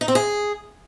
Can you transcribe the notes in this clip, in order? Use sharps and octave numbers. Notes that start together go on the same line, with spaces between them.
D#4
C4
G#4